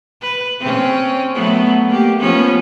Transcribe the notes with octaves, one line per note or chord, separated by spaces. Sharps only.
B4
C4 C#4
F#3 A3 B3
A#3 G4
F3 B3 C#4